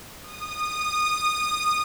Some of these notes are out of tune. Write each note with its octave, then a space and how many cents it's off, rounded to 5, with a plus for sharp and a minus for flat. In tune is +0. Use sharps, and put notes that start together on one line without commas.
D#6 -20